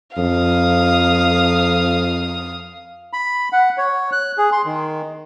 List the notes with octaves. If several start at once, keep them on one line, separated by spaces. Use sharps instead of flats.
F2 F5 D#6
B5
F#5
C#5
F#6
G#4
C6
D#3